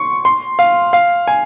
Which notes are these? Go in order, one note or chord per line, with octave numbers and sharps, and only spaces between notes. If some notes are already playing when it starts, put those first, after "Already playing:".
Already playing: C6 C#6
C6
F5
F5
G#5